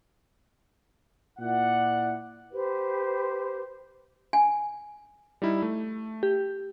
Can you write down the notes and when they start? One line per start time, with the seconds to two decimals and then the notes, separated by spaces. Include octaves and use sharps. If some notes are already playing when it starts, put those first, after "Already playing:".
1.39 A#2 E4 D5 F#5
2.52 G4 B4 C5
4.33 G#5
5.42 G3 D#4 E4
5.62 A3
6.23 G4